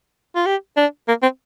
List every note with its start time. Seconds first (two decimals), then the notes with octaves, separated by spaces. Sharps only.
0.36 F4
0.46 G4
0.77 D4
1.08 A#3
1.22 C4